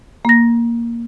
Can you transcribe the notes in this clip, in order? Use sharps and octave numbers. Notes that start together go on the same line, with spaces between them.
A#3 A#6